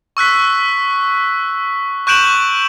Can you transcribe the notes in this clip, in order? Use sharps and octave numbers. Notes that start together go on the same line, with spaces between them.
C#6 E6 F#6 B6
C#6 F#6 G6 D7 E7 F#7